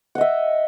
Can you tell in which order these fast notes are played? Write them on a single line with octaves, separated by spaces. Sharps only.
F#5 D#5 E5